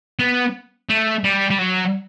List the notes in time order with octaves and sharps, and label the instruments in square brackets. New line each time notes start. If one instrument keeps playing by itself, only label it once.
[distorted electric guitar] B3
A3
G3
G3
F#3